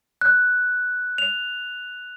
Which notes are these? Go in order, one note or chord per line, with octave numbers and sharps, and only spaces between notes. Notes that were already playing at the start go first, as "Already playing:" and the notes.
F#6
F7